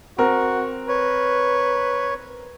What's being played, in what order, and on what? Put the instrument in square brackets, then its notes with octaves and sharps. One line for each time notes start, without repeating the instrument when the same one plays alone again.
[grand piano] C4 A#4 [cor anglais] F#4
[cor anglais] B4 [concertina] C#5